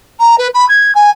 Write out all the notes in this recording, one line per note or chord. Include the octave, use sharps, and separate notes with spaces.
A#5
B4
B5
G#6
G#5